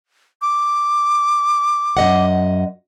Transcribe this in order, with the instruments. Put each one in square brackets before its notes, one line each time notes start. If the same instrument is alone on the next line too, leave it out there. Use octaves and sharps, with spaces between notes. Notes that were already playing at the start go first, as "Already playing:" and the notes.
[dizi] D6
[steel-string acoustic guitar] F#2 D#5 F#5